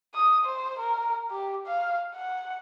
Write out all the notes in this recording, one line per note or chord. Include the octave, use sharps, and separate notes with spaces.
D#6
C5
A#4
G4
F5
F#5